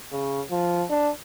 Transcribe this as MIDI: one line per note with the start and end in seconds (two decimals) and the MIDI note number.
0.12 0.41 49
0.51 0.84 53
0.90 1.10 62